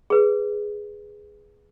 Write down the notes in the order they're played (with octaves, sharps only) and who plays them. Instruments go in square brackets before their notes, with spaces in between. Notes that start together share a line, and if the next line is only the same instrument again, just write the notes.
[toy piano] G#4 B4